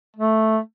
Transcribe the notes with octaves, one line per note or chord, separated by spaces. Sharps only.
A3